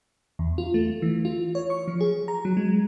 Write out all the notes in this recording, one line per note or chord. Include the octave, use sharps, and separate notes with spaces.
E2
F4
A3
E3
F4
C#5
C#6
F3
G#4
A#5
F#3
G#3